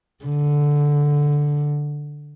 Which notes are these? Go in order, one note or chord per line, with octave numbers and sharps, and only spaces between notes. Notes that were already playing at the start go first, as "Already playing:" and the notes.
D3